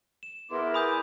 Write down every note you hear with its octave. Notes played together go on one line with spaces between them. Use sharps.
E7
E2 B3 E4 A#4 C6 D6
G#5 B5 D#6 G6